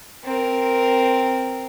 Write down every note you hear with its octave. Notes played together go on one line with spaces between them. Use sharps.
C4 A#4